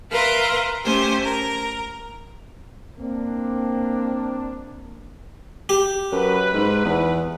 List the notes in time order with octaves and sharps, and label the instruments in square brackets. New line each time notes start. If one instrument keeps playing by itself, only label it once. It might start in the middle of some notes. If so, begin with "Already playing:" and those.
[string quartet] A#4 B4 E5 F5 A#5 C6
A3 C#4 G4 C5 G#5
A#4
[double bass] A#3 [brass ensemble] C4 D4
[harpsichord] G4
[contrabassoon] F#2 [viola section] B4
[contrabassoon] G#2
E2